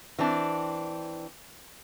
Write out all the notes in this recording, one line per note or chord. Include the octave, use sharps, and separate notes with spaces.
E3 C4 D4